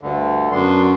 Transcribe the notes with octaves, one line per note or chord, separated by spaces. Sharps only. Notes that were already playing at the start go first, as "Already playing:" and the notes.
D2 G2 D3
F#2 B3 D4 C6